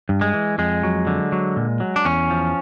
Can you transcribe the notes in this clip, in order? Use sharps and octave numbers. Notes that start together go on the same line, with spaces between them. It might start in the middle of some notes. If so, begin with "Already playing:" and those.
G2
G#3
E3
F2 G#3
F#3
D3
F#3
A#2
F#3
D4
E2 C#4
F3